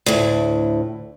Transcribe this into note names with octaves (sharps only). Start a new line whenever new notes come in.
D2 A2